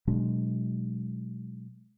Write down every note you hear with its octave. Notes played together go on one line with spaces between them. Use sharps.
B2 F#3 G#3 D4